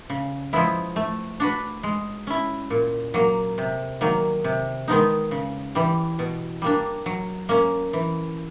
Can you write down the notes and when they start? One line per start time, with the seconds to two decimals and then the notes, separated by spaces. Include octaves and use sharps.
0.10 C#3
0.53 F3 G#3 B3 E4
0.96 A3
1.40 D4 F#4 B4
1.83 G#3
2.27 C#4 E4
2.70 A#2
3.14 F#3 A#3
3.58 C3
4.01 D#3 F#3 A#3
4.44 C3
4.88 D#3 G#3 B3 D#4
5.31 C#3
5.75 E3 G3
6.19 B2
6.62 G3 A#3 D4
7.06 F#3
7.49 A#3 C#4
7.93 E3